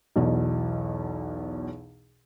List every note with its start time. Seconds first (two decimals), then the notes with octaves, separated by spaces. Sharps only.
0.16 B1 E2 B2